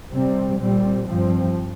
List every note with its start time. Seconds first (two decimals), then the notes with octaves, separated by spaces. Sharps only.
0.13 C3 G3 C4
0.60 A#2 G3 C4
1.07 G2 F3 C4